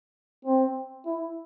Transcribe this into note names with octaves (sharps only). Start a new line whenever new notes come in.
C4
E4